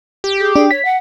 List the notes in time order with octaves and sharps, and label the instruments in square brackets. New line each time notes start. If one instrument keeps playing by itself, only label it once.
[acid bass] G4
[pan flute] G#4
[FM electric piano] D4 [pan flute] G#4
[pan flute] C#5 [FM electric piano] B6
[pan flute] F#5